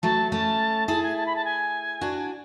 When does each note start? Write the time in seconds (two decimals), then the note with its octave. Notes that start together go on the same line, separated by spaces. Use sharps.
0.03 F#3 A3 A5
0.32 A3 C#4 A5
0.88 E4 G#4 A5
1.03 G#5
1.17 A5
1.26 B5
1.36 A5
1.45 G#5
2.01 D4 F#4